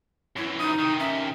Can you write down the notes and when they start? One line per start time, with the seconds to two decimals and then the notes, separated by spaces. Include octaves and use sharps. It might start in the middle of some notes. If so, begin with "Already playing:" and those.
0.37 F#2 E3 E4
0.59 D#4 D#6
0.79 C3 D#3 D#6
1.00 C#4 E5